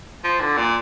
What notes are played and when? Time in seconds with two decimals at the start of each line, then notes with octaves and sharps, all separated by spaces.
0.24 F3
0.41 D3
0.58 A#2